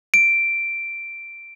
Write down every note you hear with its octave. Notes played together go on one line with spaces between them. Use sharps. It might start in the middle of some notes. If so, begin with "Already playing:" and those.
D7